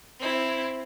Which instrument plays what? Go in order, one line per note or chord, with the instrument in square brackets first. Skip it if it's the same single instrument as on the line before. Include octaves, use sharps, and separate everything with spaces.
[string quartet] C4 E4